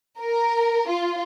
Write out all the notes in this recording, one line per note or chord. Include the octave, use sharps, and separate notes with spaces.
A#4
F4